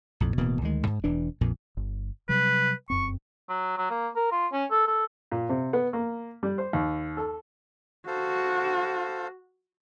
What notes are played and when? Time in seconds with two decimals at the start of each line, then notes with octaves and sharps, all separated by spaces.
0.20 A#1 F2 A2
0.37 D1 B2 E3 A#3
0.61 D2 D#3 G#3
0.87 G#2
1.04 E1 E3 D4
1.41 A#1 F2 A#2
1.77 G1
2.29 C3 F#3 G3 B4
2.90 F1 F#2 C4 C#6
3.49 F#3
3.78 F#3
3.90 A#3
4.16 A#4
4.32 F4
4.52 C#4
4.70 A4
4.87 A4
5.32 A#2
5.49 C3
5.73 B3
5.93 A#3
6.43 G3
6.58 C5
6.73 D#2
7.17 A4
8.07 F#4 A4 C5 F5